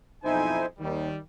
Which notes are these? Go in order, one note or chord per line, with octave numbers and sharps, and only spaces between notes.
B1 F2 D#4 E4 C5 G#5
D#2 D#3 G3